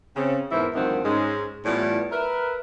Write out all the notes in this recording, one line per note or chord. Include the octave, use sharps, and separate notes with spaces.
C#3 C4
E2 G#2 E3 E4 A#4 C5
D2 G2 D#3 F3 C4 F#5
G#2 G#3 C#4
A2 E3 G3 B3 F4 D5
A#4 B4 E5